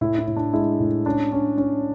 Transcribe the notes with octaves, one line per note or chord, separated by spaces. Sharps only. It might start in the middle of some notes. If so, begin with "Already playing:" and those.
A2 E4
E4
A2
D4
G#3 E4
A2
C#4 D4
C#4
C#4